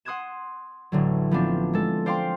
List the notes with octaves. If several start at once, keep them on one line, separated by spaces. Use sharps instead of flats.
F#5 C6 D#6 F#6 G#6 E7
A1 D3 F#3
F3 B3 C4 D4 F4
G#3 A4
C5 D5 F5 G5 C6